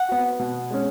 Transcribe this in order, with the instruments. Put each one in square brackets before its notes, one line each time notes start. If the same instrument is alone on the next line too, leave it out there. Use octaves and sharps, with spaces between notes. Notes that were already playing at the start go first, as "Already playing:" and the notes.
Already playing: [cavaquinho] F#5
[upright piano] B3 F#4
B2
G#3 C#4